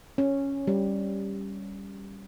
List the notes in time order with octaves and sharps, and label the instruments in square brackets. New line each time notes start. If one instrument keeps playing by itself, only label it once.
[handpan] C#4
G3